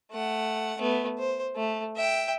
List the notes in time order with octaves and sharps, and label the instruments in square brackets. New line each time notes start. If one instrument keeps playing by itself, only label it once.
[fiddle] A3 F#5
A3 B3
C5
A3
E5 G5